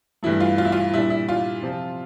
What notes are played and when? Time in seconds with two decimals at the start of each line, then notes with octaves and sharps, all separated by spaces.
0.23 G2 E3 A3 E4
0.40 F4
0.58 F4
0.65 E4
0.72 F4
0.94 A#2 G3 D4 E4
1.10 E4
1.29 F4
1.63 C3 F3 C4